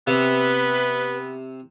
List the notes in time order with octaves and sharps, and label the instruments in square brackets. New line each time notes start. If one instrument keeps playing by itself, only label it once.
[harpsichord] C3 [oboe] B3 [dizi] B4